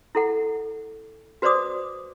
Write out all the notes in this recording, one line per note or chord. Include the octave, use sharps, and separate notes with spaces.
E4 A4 F#5
F#4 B4 C5 D5 D6 D#6